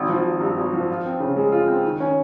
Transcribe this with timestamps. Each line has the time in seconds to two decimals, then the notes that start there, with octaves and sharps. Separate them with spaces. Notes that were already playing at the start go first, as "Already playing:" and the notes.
Already playing: G#1
0.09 F3
0.25 G#1
0.41 G2
0.57 G#1
0.73 F3
0.88 F4
1.05 C4
1.20 C#3
1.37 G#3
1.52 F4
1.68 C4
1.84 D#3
2.00 C#4